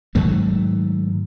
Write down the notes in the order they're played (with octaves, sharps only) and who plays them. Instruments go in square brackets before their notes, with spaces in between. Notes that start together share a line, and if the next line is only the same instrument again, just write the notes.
[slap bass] G#2 D#3 F#3 A3